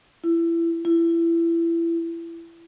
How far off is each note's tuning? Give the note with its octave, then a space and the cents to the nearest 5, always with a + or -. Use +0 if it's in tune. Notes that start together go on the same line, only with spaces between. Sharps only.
E4 +25
E4 +25